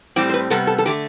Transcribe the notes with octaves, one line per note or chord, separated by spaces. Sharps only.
A2 G3 C4 G4
C5
B4
C3 G3 B3 A4
A4
A4
D3 A3 G4